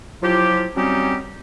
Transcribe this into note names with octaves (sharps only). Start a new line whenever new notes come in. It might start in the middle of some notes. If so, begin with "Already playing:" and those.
F3 F#3 E4 F4 G4
F#3 G3 C4 C#4 D#4 G4